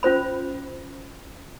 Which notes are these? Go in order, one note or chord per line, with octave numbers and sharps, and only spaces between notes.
C#4 F4 C5 B5